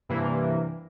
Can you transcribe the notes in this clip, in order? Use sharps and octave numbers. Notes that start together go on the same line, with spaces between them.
G2 C3 E3 A#3